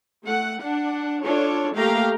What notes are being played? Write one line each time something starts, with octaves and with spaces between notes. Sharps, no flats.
A3 F#5
D4 F#5
D4 F4 A4 C#5
A3 A#3 G4 F5 G5 A#5